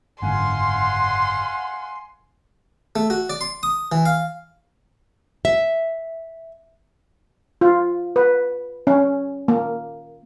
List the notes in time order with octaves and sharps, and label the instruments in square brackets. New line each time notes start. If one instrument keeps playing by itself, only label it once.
[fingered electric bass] F#1 G#2 D3 [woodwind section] F5 F#5 G#5 [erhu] C6
[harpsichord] A3
F#4
D5
C6
D#6
E3
F5
[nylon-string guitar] E5
[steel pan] F4
B4
C#4
A#3